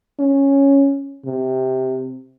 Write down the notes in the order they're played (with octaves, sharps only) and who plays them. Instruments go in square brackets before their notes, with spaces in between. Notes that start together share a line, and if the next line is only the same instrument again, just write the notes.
[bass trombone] C#4
C3